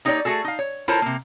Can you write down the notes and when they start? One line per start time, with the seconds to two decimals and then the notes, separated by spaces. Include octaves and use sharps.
0.05 A#3 D#4 G4 A#4 C#5 D5
0.25 A3 F#4 G#4 A4
0.44 D#4 F5
0.59 C#5
0.88 E4 F4 A4 A#4 C5 C#5
1.02 C3 A#3